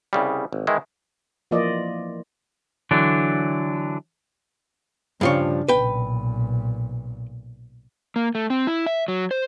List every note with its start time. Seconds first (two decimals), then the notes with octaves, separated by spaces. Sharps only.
0.13 C2 C#3 G3
0.53 G#1
0.67 D#3 E3 G#3 E4
1.51 E3 F3 A#3 F4 D5 D#5
2.91 D3 E3 F#3 D4
5.21 G2 C#3 F3 D4 C#5
5.68 B1 A#2 B4 G5
8.16 A#3
8.35 A3
8.50 C4
8.67 E4
8.86 E5
9.08 F#3
9.31 C5